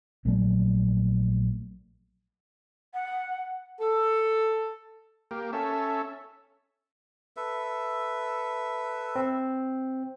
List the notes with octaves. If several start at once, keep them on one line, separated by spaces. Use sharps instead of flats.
A#1 F3 F#3 A3
F#5
A4
A#3 G4
C#4 A4 E5
A4 B4 E5
C4